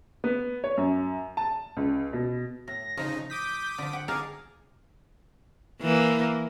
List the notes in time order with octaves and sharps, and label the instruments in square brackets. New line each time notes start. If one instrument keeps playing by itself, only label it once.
[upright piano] B3
C#5
F#2
A5
C#2
B2
[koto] A2 [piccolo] A#6
[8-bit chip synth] C#3 D#4 [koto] F3
[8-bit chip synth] D6 D#6 B6 [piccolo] G6
[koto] D3 F3
[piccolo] F#5 [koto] G5
[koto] D#4 F5 A5 [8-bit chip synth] G#4 [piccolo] D6
[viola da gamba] E3 A#3